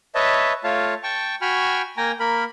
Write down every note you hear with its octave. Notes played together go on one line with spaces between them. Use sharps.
B4 C#5 D#5 E5 A5
A3 F4 C#5 F5 A5
G5 A5 C#6
F#4 G5 G#5 B5 C#6 F6
A#3 G5 G#5 A#5
A#3 A#4 B5